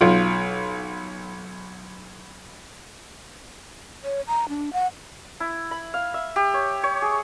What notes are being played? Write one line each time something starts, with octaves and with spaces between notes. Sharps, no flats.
B1 F4
C#5
A#5
D4
F#5
E4
B5
F5
E5
G4
C#5
C#5
G#4